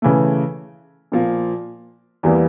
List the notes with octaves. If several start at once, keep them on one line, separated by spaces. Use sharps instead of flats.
C#3 E3 A3
A#2 F3 A#3
E2 E3 G3 A#3